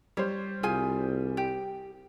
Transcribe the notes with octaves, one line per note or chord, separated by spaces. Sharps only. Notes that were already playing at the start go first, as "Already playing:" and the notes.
G3 C5 C#5
C2 F4 G#4 G#5
G4